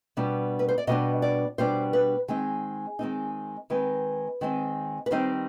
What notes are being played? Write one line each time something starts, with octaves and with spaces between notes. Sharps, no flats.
B2 G3 B3 D4
B4
C5
D5
B2 G3 B3 D4 D#5
D5
B2 G3 B3 D4 C5
B4
D#3 G#3 C4 D#4 G#4
D#3 G#3 C4 D#4
D#3 G#3 C4 D#4 B4
D#3 G#3 C4 D#4
B4
D#3 G3 C4 D#4 C5